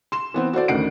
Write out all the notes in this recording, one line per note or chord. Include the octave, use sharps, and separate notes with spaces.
C6 E7
E3 B3 C4
F#4 A4 C5 D5
A1 D2 D#3 F#5 C7 D7